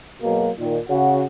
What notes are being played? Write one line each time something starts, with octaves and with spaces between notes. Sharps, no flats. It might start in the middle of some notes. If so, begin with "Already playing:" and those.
B2 F#3 G#3 A#3
A#2 D#3
C#3 F#4